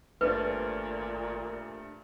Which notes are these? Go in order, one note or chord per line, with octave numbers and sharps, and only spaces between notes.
G#1 G2 A#2 A3 C4 B4